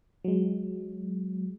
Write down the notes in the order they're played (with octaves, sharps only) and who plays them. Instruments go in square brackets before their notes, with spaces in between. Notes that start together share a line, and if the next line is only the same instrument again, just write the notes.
[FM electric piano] F#3 G#3